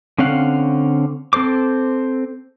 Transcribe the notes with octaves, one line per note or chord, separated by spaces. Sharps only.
D3 C4 C#4 F5 F#5
C4 A4 C5 D6